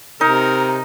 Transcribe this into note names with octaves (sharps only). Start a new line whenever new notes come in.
C3 D#4 A#4